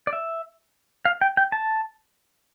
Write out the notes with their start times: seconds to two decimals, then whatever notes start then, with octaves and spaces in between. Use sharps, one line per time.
0.07 D5
0.13 E5
1.05 F5
1.21 G5
1.37 G5
1.52 A5